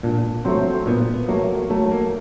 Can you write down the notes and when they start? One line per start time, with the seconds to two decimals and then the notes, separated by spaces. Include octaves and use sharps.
0.03 A#2 D4
0.45 F#3 A3 C4
0.86 A#2 B3
1.28 F#3 A3 A#3
1.70 F#3 A3
1.91 A#3